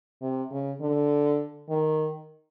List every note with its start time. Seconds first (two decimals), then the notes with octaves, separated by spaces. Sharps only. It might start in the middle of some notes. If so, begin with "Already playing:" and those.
0.22 C3
0.51 C#3
0.81 D3
1.70 D#3